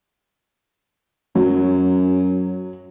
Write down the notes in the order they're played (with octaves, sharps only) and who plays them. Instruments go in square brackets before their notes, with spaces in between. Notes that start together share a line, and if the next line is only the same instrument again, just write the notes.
[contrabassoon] F#2 [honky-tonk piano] F#3